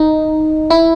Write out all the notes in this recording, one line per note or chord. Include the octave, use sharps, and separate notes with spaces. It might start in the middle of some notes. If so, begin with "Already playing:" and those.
Already playing: D#4
E4